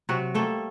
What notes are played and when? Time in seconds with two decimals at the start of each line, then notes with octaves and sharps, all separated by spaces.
0.09 C3 F#3 F#4
0.35 G3 A3 A#3 A4